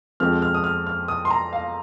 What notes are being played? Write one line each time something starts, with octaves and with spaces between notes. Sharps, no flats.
F2 F3 G#3 C4 F6
F6
D#6
F6
F6
D#6
C6
A#5
F5